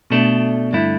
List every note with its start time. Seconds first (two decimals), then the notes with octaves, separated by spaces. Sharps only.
0.11 B2 A3 D4
0.73 G2 D3 A3 E4